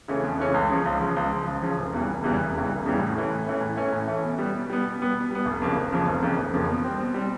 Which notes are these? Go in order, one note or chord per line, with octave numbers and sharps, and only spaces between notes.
C#3 E3 A3 C#4
F2
C#3 E3 A3 C#4
C#2
C#3 F3
C#2
C#3 F3
C#2
C#3 F3
C#2
C#3 F3
F1
E2 C#3 E3 G3
F1
E2 C#3 E3 G3
F1
E2 C#3 E3 G3
F1
E2 C#3 E3 G3
A2
E3 A3 C#4
A2
E3 A3 C#4
A2
E3 A3 C#4
A2
E3 A3 C#4
B2
G3 B3
B2
G3 B3
B2
G3 B3
B2
G3 B3
F1
F2 C#3 F3 A#3
F1
F2 C#3 F3 A#3
F1
F2 C#3 F3 A#3
F1
F2 C#3 F3 A#3
B2
G3 C4
B2
G3 C4